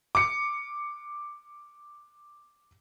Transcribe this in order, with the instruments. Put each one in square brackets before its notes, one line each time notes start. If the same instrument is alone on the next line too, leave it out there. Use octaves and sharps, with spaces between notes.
[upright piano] D6 C#7